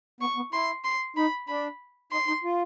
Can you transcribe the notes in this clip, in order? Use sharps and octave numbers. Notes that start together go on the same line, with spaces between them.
B3 C#6
B3
E4 C6
C6
D#4 B5
D4 B5
D#4 C6
D#4
F4